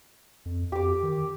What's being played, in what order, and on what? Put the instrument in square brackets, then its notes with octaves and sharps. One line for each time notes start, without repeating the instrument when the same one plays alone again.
[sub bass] F2
[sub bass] F2 [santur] G4 D6
[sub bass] D#3